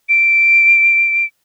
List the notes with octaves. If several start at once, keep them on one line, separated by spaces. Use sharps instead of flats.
D7